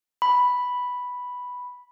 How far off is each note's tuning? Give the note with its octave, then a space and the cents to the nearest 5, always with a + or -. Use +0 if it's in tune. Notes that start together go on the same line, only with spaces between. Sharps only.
B5 +0